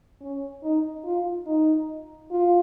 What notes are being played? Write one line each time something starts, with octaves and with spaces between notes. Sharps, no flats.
C#4
D#4
F4
D#4
F4